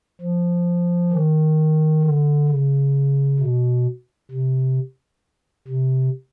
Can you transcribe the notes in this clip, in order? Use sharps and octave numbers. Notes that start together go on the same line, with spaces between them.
F3
D#3
D3
C#3
B2
C3
C3